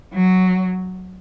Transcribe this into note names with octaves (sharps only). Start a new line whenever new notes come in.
F#3